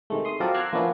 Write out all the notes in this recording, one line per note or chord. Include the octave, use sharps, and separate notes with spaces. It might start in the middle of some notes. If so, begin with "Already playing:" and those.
C3 D#3 G#3 A3
C6 D#6
F#3 C4 F4 A4 A#4 D5
A#5 D6 E6 F#6 G#6 C7
F3 A#3 B3 C#4 D4 E4